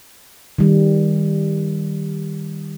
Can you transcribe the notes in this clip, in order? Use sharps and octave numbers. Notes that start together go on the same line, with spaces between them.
D#3 G3